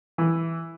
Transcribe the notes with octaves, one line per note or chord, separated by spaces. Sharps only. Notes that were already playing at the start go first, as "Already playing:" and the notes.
E3